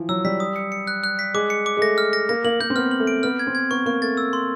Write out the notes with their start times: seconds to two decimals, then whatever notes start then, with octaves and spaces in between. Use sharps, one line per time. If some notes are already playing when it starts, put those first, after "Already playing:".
Already playing: E3 F3
0.09 F#3 E6
0.25 G3 B6
0.40 D#6
0.56 C#7
0.72 C#7
0.87 F#6
1.04 F#6
1.19 B6
1.34 G#3 D6
1.50 C#7
1.66 D6
1.77 G#3
1.81 A3 A#6
1.98 F6
2.13 A#6
2.29 A#3 A#6
2.44 A#3 F#7
2.60 A#3 G6
2.70 C4
2.76 B3 F6
2.91 F#7
3.00 A3
3.07 D7
3.23 B3 F6
3.39 G#6
3.47 C4
3.55 G#6
3.71 B3 C#6
3.86 A#3 C#6
4.02 A3 A6
4.17 E6
4.33 C6